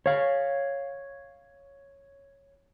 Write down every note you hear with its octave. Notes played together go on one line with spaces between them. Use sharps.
C#5 F5